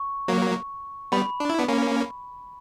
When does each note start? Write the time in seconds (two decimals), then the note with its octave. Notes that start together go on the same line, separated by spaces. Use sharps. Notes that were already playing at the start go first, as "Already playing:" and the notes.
Already playing: C#6
0.28 F#3 A#3
1.12 G3 B3 B5
1.40 D4
1.50 E4
1.58 B3 D4
1.68 A#3 C#4